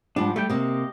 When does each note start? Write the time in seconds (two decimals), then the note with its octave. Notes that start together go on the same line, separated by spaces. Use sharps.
0.16 G#2 F3 G3 D4
0.36 G3 A3 G4 G5
0.50 C3 A#3 G4 D#5